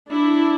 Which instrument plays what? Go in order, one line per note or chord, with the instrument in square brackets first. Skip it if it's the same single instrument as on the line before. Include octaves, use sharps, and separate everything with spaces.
[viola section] D4 E4